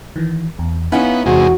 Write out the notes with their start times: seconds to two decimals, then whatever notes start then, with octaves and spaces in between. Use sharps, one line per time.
0.16 D#3 E3
0.59 E2
0.92 B3 C#4 D#4 E4 F5 F#5 G#5
1.26 E2 C3 E3 G#3 F#4